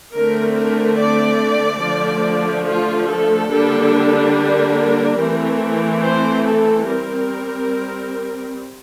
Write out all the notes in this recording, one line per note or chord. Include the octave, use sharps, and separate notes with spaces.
D3 A3 C4 A#4
A#4
D5
D3 F3 A3
F4
A4
D3 G3 A#3 D4
A#4
E3 A3 C4
C5
A4
G3 C4 A#4